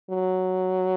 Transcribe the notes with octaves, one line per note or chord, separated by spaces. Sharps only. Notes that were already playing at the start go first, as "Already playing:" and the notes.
F#3